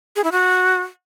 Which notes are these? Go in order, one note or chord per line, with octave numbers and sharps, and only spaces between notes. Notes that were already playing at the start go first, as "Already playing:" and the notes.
G#4
E4
F#4